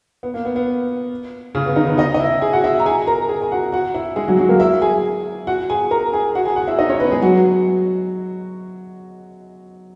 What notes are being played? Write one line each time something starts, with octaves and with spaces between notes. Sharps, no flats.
B3
A#3
B3
B3
C#3 C#4
B3
D#3 D#4
B3 B4
D#4 D#5
D#5
E4 E5
G#4 G#5
F#4 F#5
E4 E5
A#5
G#4 G#5
A#4 A#5
G#4 G#5
G#5
F#4 F#5
F#4 F#5
E4 E5
G#3 G#4
F#3 F#4
F#3 F#4
A#3 A#4
E4 E5
G#4 G#5
F#4 F#5
G#4 G#5
A#4 A#5
G#4 G#5
F#4 F#5
G#4 G#5
F#4 F#5
E4 E5
D#4 D#5
C#4 C#5
B3 B4
G#3 G#4
F#3 F#4